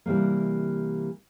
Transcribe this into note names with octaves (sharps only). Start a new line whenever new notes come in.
C3 E3 G3 G#3 A#3